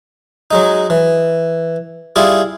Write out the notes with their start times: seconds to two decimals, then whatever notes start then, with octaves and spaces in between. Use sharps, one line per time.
0.51 F#3 G#3 D#4
0.90 E3
2.16 G3 E4 F4 G#4